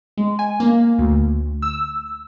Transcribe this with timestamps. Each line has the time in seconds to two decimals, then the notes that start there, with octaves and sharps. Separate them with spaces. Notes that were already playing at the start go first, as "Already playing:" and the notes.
0.17 G#3
0.39 G#5
0.60 A#3
0.98 D2
1.62 E6